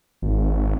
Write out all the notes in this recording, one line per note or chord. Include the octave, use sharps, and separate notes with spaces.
G#1